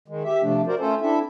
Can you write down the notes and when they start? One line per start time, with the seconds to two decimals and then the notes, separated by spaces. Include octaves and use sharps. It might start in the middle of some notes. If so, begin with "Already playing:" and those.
0.08 D#3 G#3
0.24 G4 E5
0.42 C3 F3 A3 D4
0.67 F#4 A#4 C5 D5
0.79 A3 C#4 F4 A4 C5
1.01 C4 D4 E4 A4 E5